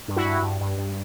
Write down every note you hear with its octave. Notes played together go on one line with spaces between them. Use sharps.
G2
E4 F#4
G2
G2
G2
G2